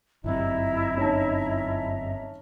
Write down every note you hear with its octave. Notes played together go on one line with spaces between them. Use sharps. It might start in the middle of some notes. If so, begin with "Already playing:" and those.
G1 F#2 C3 E4 D#5 E5 A#5
C#4 D#4 A5